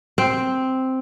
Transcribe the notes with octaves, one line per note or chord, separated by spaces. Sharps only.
C4